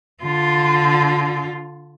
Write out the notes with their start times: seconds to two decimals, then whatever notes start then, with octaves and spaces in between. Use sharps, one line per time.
0.23 D3 F4